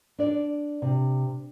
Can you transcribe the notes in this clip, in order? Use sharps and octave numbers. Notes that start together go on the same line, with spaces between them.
D4 D5
C3